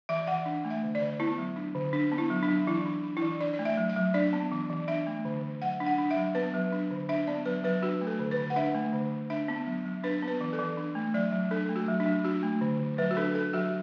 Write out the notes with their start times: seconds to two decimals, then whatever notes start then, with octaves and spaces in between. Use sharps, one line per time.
0.09 E3 E5
0.27 E3 F#5
0.46 D4
0.65 A3
0.70 E5
0.83 D3
0.95 D5
1.01 D3
1.20 B3 E4
1.38 F#3
1.56 D4
1.75 D3
1.93 D4
2.12 B3
2.18 E4
2.30 F#3
2.43 D4
2.48 F#3
2.67 E3 E4
2.85 D4
3.03 D4
3.17 E4
3.22 E3
3.41 D4 D5
3.54 D5
3.59 A3
3.65 E5
3.77 F#3
3.89 E5
3.96 F#3
4.14 D4 D5
4.33 B3
4.52 E3
4.70 E3
4.88 D4 E5
5.07 A3
5.25 D3
5.43 D3
5.62 F#3 F#5
5.80 D4
5.86 F#5
5.98 D4
6.11 E5
6.16 F#3
6.35 B3 B4
6.54 F#3
6.72 D4
6.91 D3
7.09 D4 E5
7.27 B3 D5
7.45 F#3 B4
7.64 F#3 B4
7.83 D4 F#4
8.01 A3
8.07 A4
8.19 D3
8.31 B4
8.37 D3
8.50 F#5
8.56 D4 E5
8.75 A3
8.93 D3
9.11 D3
9.30 D4 E5
9.48 B3
9.67 F#3
9.85 F#3
10.04 D4 B4
10.22 B3
10.28 B4
10.41 E3
10.53 A4
10.59 E3
10.77 D4
10.95 A3
11.14 F#3 D5
11.32 F#3
11.51 D4 A4
11.69 A3
11.76 F#4
11.88 F#3
12.00 D4
12.06 F#3
12.25 D4 F#4
12.43 A3
12.61 D3
12.80 D3
12.98 F#3 B4
13.11 F#4
13.16 D4 A4
13.35 D4 A4
13.53 F#3 F#4